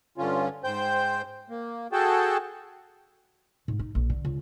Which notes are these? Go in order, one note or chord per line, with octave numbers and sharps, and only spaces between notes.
G2 D3 C#4 F4
G#2 C5 G5 G6
A#3
F#4 G#4 A4 G5 A5
G#2
D#4
A#1
D3
C#2